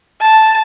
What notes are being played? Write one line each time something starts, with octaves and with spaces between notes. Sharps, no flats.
A5